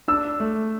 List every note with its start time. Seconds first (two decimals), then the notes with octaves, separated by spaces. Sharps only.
0.08 D4 E6
0.40 A3